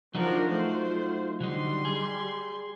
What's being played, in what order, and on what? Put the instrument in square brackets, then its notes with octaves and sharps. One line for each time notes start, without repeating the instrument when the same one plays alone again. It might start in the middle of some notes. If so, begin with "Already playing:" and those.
[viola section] F3 D4 A#4 [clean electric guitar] F#3 D#4 F#4
[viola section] A3 F4 C5
[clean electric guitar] D3 F#3 D#4 [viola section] G3 C6
[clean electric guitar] G#4